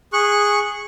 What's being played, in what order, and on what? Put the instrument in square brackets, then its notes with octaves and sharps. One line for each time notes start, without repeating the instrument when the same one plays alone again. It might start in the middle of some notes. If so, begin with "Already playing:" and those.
[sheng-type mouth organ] G#4 C#6 F#6